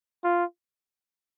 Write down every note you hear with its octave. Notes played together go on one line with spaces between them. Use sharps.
F4